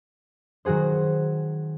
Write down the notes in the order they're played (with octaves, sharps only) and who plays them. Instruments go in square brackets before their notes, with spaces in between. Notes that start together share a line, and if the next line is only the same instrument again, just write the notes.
[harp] D#3 F#3 F#4 G#4 C5